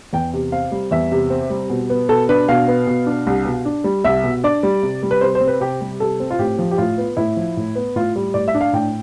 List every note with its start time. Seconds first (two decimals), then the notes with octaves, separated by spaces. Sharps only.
0.13 E2 G5
0.33 C3
0.52 C4 F5
0.72 G3
0.91 E2 E5
1.12 C3
1.30 C4
1.50 G3
1.70 B2
1.90 B3
2.09 B2 A4
2.29 D4 B4
2.49 B2 F5
2.68 B3
2.87 B2
3.06 D4
3.27 C2
3.45 B2
3.65 D4
3.84 G3
4.04 C2 E5
4.24 B2
4.44 D4 D5
4.63 G3
4.83 C3
5.03 G3
5.11 B4
5.21 C3 C5
5.35 C5
5.41 C4
5.47 B4
5.61 C3 G4
5.81 G3
6.00 C3 A4
6.20 C4
6.30 F4
6.39 A2 G4
6.59 F3
6.71 G4
6.78 A2 F4
6.98 B3
7.17 A2 E4
7.37 F3
7.57 A2
7.75 B3
7.96 A2 F4
8.16 G3
8.34 A2 D5
8.48 E5
8.55 D4
8.61 F5
8.73 A2 G5